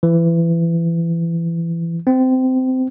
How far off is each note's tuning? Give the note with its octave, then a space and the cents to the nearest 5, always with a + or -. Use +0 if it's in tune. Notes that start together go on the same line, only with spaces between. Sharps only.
E3 +25
C4 -20